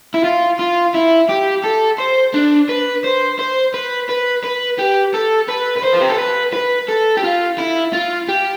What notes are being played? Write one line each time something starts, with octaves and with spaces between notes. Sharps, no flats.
E4
F4
F4
E4
G4
A4
C5
D4
B4
C5
C5
B4
B4
B4
G4
A4
B4
B4
C5
F4
G4
A4
B4
B4
A4
G4
F4
E4
F4
G4